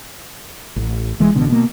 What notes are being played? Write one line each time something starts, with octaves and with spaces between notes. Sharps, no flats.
A1
D#1 E3 G#3
A1 B2 D3
B2 A#3